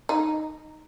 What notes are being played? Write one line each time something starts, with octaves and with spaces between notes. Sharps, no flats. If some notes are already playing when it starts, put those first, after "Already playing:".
D#4